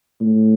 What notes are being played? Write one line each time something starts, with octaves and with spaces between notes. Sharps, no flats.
A2